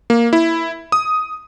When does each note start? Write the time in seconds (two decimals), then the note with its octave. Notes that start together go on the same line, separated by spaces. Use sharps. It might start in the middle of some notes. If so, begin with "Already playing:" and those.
0.10 A#3
0.33 E4
0.92 D#6